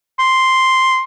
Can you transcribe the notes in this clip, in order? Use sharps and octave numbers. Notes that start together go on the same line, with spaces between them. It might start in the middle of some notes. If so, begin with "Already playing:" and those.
C6